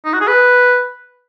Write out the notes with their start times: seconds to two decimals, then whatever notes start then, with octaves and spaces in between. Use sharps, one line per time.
0.05 D#4
0.13 F#4
0.20 G#4
0.28 B4